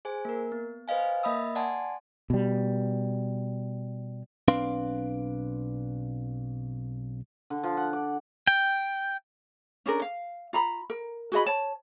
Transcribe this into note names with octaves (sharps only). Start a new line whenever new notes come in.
G#4 C5 G#5
A#3 A#4
B3
B4 C5 D#5 F5 G#5
A#3 D#5 E5 B5 D#6 E6
D5 F#5 G#5 A5 C6
B2 G3
B1 C4 D4 B4 F5 C6
D3
F3
F#5
D5
G5
C#4 D4 G#4 A#4
F5
F4 A#5 B5
A#4
F#4 G#4 D#5 B5
C#5 A5